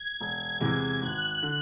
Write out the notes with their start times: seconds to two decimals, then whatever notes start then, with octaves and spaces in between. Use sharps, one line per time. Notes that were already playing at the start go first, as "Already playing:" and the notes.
Already playing: G#6
0.20 E1 G#6
0.60 E2 C3 E3 G#3
1.01 G#1 F#6
1.42 D3